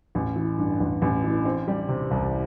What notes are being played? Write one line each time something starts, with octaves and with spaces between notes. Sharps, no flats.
A1
E3
G2
A1
A1
E3
C4
G3
C3
C2